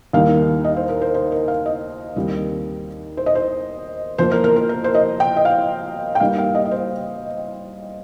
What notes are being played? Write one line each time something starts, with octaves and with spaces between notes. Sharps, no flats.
D#2 D#3 G3 A#3 D#4 F5
D#5
C5
A#4
C5
C5
A#4
F5
D#5
D#2 D#3 G3 C4
C5
D#5
C5
F2 F3 A#3 C5
A#4
A#4
A#4
A#4
C5
D#5
G5
D#5
F5
G5
G2 G3 A#3 D#4 F5
F5
D#5
D#5
C5